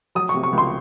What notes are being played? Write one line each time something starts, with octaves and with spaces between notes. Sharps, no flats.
F#3 D#6
C#6
C3
C#6
C#2
C6